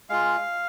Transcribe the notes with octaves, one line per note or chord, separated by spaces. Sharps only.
G#3 F4 F5